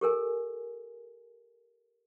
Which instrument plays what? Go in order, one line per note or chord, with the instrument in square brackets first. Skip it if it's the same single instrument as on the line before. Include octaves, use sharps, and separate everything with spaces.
[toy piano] G4 A4 A#4 G#5